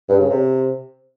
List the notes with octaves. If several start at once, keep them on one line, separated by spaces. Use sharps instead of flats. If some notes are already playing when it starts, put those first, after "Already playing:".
G2
C#3
C3